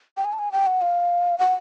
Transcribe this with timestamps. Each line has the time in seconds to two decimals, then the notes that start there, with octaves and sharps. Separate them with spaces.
0.17 G5
0.25 G#5
0.33 A5
0.39 G#5
0.52 G5
0.67 F#5
0.81 F5
1.39 F#5